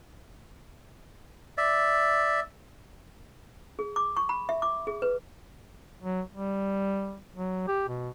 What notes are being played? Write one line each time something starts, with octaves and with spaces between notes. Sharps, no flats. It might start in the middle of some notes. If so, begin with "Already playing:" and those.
D5 E5
G#4
D6
C#6
B5
E5
D6
G#4
B4
F#3
G3
F#3
G4
B2